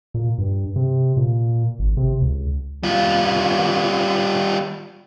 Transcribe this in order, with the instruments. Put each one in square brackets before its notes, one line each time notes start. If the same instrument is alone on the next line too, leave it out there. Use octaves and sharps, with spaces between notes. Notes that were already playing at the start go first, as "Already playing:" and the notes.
[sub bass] A#2
G2
C3
A#2
G#1
C3
C#2
[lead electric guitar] G3 F4